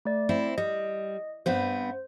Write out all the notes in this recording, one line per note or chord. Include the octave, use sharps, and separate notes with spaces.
A3 D5
C4 E4
G3 D#5
G2 B3 C4 C5